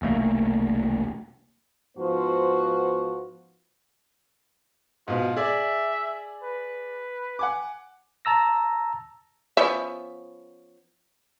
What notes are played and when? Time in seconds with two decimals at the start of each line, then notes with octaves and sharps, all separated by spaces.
0.02 E1 C2 A3 A#3
1.97 G#2 F3 B3 F#4 C5
5.08 G#2 B2 F4
5.36 G#4 D5 E5
6.43 B4
7.39 F#5 G#5 D6
8.25 A5 A#5 E6 A#6
9.57 F3 B3 C#4 E5